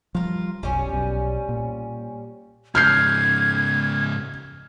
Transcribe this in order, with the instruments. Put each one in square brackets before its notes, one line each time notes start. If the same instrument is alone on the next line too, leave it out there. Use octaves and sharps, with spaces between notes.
[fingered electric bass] F3 G3 [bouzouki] F4 A#4
[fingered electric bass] F1 B1 [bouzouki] G3 C#4
[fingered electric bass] B1
A#2
[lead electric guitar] G#2 C#3 [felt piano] F6 G6 C7 [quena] G#6